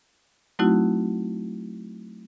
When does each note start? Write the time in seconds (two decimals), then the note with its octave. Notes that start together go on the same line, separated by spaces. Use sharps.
0.59 F#3 A3 C4 D#4 E4 F#4